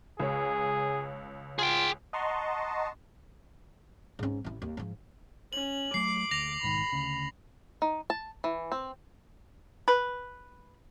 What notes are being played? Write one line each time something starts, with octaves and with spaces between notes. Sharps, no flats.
C#2 G#4 C#5
F4 G#4 G5
D#5 F#5 A5 A#5 C6 C#6
G#2 C#4
A1 E4
D#2
G#2 F3
C#4 F#7
F#3 A3 D6 C7
D2 A#6 F7
B1 G#2 D#3 B5
D2 C#3
D#4
A5
E3
C4
B4